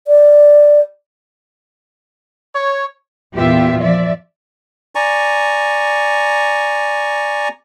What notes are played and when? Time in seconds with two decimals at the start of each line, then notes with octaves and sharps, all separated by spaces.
0.07 D5
2.54 C#5
3.34 E2 A#2 B3 F4 G4 E5
3.80 F3 D5 E5
4.95 D5 G#5 A#5 C#6